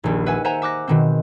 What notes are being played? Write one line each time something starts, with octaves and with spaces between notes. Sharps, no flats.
D#1 A#1
B4 E5 F#5 G#5
C5 E5 F#5 G#5 A#5
E5 D6 F#6 A#6
B2 D#3 C4